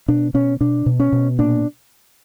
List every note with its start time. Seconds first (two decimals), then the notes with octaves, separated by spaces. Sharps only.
0.08 B2 D4
0.34 B2 C#4
0.61 B2 D4
0.86 B2
1.00 C#4
1.12 B2
1.39 A#2 D4